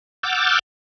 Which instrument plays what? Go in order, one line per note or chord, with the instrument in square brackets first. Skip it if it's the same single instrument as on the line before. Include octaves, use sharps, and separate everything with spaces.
[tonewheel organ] F#5 D6 E6 F6 G6 A6